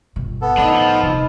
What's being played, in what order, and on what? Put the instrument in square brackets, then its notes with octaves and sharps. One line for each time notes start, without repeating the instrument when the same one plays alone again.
[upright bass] G1 B2
[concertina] B3 A4
[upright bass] A2 [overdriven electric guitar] D3 D4 [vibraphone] D#4 D#5 B5
[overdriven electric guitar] F3
[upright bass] D#1 C3